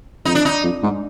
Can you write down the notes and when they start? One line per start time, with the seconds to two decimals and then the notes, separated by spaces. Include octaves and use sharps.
0.25 F2 D#4
0.35 D4
0.45 D#4
0.63 F2
0.83 G#2